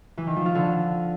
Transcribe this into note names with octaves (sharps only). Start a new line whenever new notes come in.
E3
D#3
F3
F4
D3